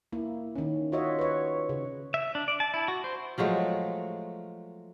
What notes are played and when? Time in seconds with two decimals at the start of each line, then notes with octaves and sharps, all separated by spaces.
0.12 A#3 E4
0.56 D#3 C#4
0.92 F4 F#4 C#5 D#5 E5
1.19 B4 C#5
1.69 C#3
2.14 E5
2.35 D4
2.48 D5
2.60 A5
2.74 E4
2.88 F#4
3.04 C5
3.38 F3 F#3 G#3 A3